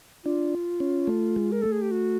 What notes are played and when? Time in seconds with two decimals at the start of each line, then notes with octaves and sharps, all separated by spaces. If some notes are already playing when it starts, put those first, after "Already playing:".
0.25 D4 F4
0.80 C#4
1.07 A3
1.36 G#3
1.52 A#4
1.62 A3 A4
1.72 G#4
1.82 G4
1.91 F#4